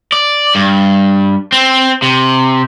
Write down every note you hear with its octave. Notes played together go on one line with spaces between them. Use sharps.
D5
G2
C4
C3